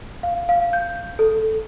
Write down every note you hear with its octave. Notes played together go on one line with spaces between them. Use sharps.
F5
F5
G6
A4